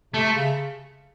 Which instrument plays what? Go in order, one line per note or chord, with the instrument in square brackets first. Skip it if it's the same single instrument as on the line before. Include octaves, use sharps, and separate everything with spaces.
[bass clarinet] C3 [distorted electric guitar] A3
[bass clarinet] C#3